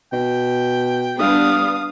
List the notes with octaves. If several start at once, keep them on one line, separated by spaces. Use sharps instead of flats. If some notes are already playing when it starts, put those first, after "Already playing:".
B2 G5
G3 B3 D4 F5 D#6